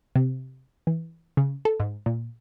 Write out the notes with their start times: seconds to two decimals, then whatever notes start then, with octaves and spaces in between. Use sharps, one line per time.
0.16 C3
0.87 E3
1.37 C#3
1.65 A4
1.80 G#2
2.06 A#2